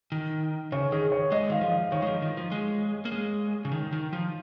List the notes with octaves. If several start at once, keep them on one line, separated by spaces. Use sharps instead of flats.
D#3
C#3 C#5
D#3 G#4
C#5
G#3 D#5
D#3 F5
F3
D#5
D#3 C#5
G#3
F3
D#3
F3
G#3
A#3
G#3
C#3
D#3
D#3
F3